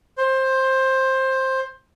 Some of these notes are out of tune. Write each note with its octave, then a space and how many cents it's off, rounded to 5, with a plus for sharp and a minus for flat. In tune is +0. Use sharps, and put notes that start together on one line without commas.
C5 +15